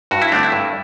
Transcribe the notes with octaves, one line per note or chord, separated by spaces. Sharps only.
G2 F#4
E4
D3 A3 C4 D4
E4
G2